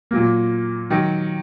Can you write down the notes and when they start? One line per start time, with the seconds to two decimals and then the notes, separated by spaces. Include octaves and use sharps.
0.11 A#2 F#3 A#3
0.90 D#3 F#3